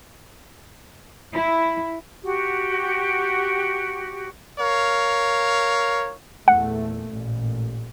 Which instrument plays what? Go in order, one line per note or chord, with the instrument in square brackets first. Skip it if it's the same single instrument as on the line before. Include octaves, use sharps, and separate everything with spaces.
[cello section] E4
[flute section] F#4 G4
[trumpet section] A#4 C#5 F5
[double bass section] E2 A#2 A3 [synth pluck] F#5
[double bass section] A1 A#2